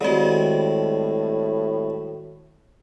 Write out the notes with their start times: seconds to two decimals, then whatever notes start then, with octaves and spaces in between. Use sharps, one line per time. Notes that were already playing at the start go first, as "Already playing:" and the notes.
0.01 A2 D#3 G3 G#3 C4 F#4